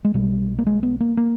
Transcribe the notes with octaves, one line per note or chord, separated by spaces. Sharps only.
G#3
B1 B2 G3
A#3
G#3
B3
A#3
A#3